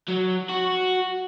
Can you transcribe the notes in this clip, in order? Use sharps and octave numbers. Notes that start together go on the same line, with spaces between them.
F#3
F#4